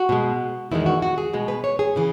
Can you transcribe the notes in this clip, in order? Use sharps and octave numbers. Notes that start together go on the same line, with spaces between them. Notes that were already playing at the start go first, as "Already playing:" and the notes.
Already playing: F#4
B2 G#3
E2 D#3 G#3 E4
F#4
F#4
G#4
B2 G#3
B4
C#5
G#4
C#3 E3